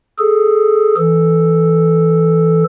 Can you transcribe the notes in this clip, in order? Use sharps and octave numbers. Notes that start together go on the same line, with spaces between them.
G#4 A4
E3 A4